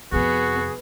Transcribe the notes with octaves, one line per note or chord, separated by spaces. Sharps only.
F2 C3 B3 F#4 G#4